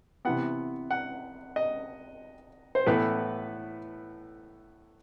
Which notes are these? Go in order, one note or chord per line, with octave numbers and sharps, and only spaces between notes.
C3 E3 B3 F#5
F#5
D#5
C5
A2 E3 B3 B4